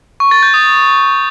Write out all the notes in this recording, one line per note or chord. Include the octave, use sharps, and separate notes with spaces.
C#6
A6
G6
D#6